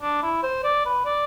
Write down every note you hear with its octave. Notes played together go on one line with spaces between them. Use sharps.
D4
E4
C5
D5
B4
D5